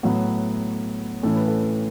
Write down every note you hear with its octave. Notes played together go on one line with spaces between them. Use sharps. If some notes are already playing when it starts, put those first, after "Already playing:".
A2 F#3 B3 F#4
A2 E3 A3 C#4 A4
B4
A4